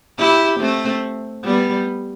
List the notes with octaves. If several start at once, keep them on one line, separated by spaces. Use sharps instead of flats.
E4 G4
A3 C4
G3 B3